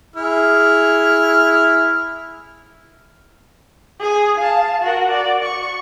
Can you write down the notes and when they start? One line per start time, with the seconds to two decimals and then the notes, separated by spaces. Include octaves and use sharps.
0.16 E4 G#4 F6
4.00 G#4 G#5
4.38 F5 A5
4.82 F#4 A#4
5.11 D5
5.43 C#6